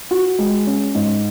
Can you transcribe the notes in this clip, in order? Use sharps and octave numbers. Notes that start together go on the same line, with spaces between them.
F#4
G#3
C#4
G#2